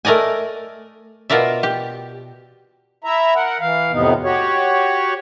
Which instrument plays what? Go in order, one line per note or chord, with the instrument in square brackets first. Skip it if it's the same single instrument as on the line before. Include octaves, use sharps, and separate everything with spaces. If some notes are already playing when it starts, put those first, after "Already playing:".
[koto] A3 A#4 D5 D#5 G#5
B2 F4 A#4 D5 E5
G4
[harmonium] E4 E5 A#5
A#4 F#5
E3 F5
F2 A2 C3 B3 D#4
F#4 G4 C#5